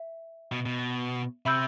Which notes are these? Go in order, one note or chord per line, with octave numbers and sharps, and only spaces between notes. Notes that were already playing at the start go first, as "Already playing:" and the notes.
Already playing: E5
B2
B2
C3 E5 B5 E6 G6